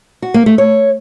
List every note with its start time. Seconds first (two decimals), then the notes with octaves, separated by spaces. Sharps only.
0.22 F#4
0.34 A#3
0.46 A3
0.58 C#5